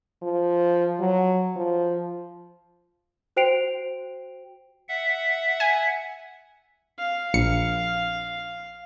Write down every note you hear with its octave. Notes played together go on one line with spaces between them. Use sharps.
F3
F#3
F3
F#4 C5 G5 C7 D7 F7
E5 F#5
G#5
F5
A#1 C#7